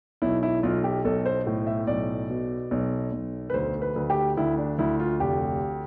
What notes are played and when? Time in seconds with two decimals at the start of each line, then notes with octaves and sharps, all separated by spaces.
0.22 B1 E4
0.43 E4
0.63 B1 F4
0.84 G4
1.05 B1 A4
1.26 C5
1.47 A2
1.67 E5
1.87 B1 D5
2.30 B2
2.71 B1
3.12 B1
3.50 B4
3.54 D2 C5
3.82 B4
3.96 D2
4.10 G4
4.37 D2 E4
4.58 D4
4.79 D2 E4
4.99 F4
5.20 F1 G4